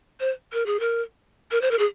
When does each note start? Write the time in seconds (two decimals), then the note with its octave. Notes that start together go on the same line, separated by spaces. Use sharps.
0.20 C5
0.53 A#4
0.66 G#4
0.80 A#4
1.51 A#4
1.62 C5
1.71 A#4
1.79 G#4